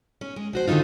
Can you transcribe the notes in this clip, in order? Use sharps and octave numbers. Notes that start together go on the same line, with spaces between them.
C#4
G#3
F3 F#4 C5
D3 D#3 A#3 D#4 F4